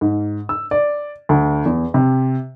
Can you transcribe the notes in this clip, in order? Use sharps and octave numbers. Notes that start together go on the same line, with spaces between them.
G#2
E6
D5
D2
E2
C3